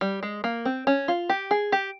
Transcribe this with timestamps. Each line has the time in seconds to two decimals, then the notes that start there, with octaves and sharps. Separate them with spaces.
0.01 G3
0.23 G#3
0.44 A#3
0.65 C4
0.87 C#4
1.08 F4
1.29 G4
1.51 G#4
1.72 G4